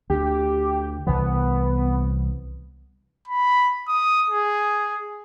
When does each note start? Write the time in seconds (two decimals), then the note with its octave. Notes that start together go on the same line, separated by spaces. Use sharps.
0.10 D2 G4
1.07 C2 E3 B3
3.28 B5
3.88 D#6
4.30 G#4